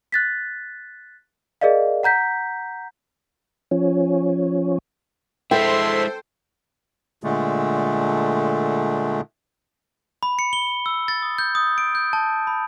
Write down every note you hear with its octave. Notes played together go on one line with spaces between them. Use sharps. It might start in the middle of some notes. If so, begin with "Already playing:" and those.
F#6 A6 B6
G#4 A#4 D5 D#5 F5
F#5 A#5 G6 B6
F3 C#4
G#3 E4 A4 C5 E5 G5 C6
A#2 D3 G#3 A3
B5
C#7
G7
E6
A6
D#6
G6
D#6
D7
G6
A5
B5